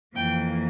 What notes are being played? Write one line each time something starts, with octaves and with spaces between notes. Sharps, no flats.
F2 E3 A#3 G5